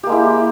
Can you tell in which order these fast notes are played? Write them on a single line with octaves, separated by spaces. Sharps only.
G4 A#3 G#3 E4